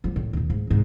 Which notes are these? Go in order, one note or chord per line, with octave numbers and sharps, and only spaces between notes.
F3 G3
A2
D#2 A#2
G#2
G#2 C3